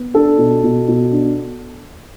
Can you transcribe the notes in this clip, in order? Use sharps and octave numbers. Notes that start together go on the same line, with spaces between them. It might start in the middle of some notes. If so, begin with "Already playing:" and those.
Already playing: B3
D4 A4
B2
B2
B2
D4